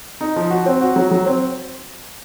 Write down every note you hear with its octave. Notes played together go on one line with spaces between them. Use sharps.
D#4
F3
F#4
C4
F#4
F#3
F#3
C4